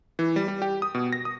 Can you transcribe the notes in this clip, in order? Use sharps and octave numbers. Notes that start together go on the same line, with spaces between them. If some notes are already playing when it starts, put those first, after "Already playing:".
E3
G3
G3
G4
D#6
B2
A#6
D#6